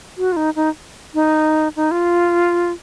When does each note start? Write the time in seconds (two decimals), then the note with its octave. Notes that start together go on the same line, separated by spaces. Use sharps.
0.18 F#4
0.32 F4
0.36 D#4
0.56 D#4
1.14 D#4
1.76 D#4
1.91 F4